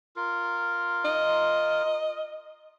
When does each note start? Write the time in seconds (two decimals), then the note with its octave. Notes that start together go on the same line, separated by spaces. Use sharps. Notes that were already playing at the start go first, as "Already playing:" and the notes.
0.16 F4 A#4
1.05 D#5